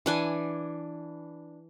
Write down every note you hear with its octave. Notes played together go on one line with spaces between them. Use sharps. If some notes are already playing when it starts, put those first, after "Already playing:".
E3 D4 G#5